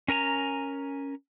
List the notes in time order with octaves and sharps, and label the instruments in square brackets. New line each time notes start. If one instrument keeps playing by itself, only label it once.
[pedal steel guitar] C#4 A#4 G#5 A#5